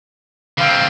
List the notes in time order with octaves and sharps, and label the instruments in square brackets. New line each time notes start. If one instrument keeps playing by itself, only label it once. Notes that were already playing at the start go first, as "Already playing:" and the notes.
[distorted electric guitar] D3 C4 [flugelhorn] F5